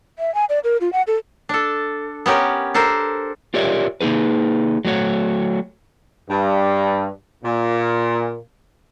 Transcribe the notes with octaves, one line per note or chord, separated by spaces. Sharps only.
E5
G#5
D5
A#4
F4
F#5
A4
D4 A4
B3 C#4 G4 A#4
D4 A4 A#4 C5
F4 G4 A#4 C#5 D5 E5
A#3 D#4 G#4 B4
F#3 A3 F#4 C#5
G2
A#2